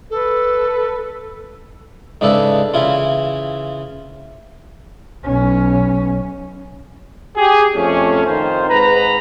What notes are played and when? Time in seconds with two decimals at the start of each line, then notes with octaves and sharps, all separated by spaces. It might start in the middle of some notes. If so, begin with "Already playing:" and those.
0.10 A4 B4
2.21 G#2 C#3 D4 A4 B4 E5
2.74 C#3 E3 E4 F4
5.24 B1 C#4
7.36 G4 G#4
7.76 F2 A3 C#4
8.26 D#3 C4 D#4 F4 C5
8.69 G#2 B4 A#5